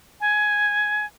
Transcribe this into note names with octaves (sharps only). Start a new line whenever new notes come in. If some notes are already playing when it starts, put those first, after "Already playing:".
G#5